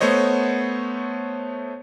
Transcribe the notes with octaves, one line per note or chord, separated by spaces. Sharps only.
A3 B3 C5 C#5 D#5